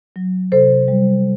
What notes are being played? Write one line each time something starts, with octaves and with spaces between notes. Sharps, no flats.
F#3
C3 A4 C5
G3